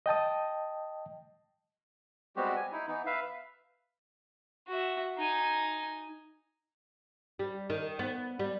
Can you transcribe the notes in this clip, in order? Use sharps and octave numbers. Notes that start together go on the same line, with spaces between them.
D#5 G5 A5 D#6
G3 G#3 B3 C4 F#4 G4
G#5
D#4 E4
E3 B3 D#4
B4 E5 F5
F#4 E5
D#4 G#5
G3
D#3
B3
G3